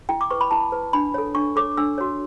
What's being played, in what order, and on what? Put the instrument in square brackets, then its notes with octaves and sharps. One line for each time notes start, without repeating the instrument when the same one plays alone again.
[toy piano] E4 G5
D6
B4 C#6
B5
E4 A5
B4
D4 B5
A4 C#5
D4 C#6
A4 C#5 D6
D4 E6
F#4 C#5